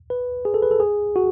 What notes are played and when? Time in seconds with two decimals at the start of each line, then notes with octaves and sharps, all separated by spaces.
0.10 B4
0.45 G#4
0.54 A4
0.62 B4
0.71 A4
0.80 G#4
1.16 F#4